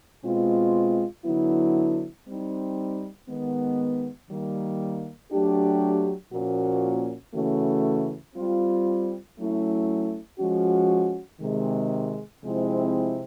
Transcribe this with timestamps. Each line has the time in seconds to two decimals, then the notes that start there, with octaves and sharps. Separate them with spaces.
0.23 B2 G#3 C4 F4
1.25 D3 F#3 B3 E4
2.26 G3 C4 D#4
3.28 D#3 G#3 B3
4.29 D#3 G3 A#3
5.31 F#3 A3 D4 G4
6.32 A#2 F3 A#3 C#4 F#4
7.34 C#3 E3 A3 C#4 F#4
8.36 G3 C4 F4
9.38 F#3 A3 C#4 E4
10.39 F3 G#3 C#4 F#4
11.41 C3 D#3 G#3
12.42 C3 F3 G#3 C4 E4